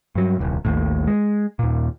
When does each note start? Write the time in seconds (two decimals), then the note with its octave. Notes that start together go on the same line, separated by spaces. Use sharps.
0.15 G2 F#3
0.39 D#1 C2
0.65 A1 D#2 A2
1.07 G#3
1.59 D#2 A#2